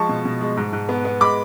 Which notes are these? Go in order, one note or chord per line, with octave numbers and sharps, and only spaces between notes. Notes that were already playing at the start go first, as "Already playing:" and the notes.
Already playing: F3 G#3 A5 C#6
B2
B2
G#3
G#2
G#2
B3
B3
G#3 B5 D6